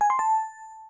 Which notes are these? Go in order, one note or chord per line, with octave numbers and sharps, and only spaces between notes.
G#5
C6
A5